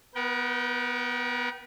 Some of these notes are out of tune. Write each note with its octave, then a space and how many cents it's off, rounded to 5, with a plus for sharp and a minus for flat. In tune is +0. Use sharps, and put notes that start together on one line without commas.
B3 +0 A#4 +45 G5 -25